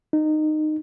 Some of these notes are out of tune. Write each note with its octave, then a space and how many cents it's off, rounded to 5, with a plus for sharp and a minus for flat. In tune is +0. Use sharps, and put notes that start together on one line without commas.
D#4 -20